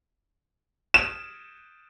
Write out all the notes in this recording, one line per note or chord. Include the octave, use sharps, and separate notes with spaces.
E7